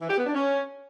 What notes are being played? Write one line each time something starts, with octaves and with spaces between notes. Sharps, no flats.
E3
G4
B3
D4
C#4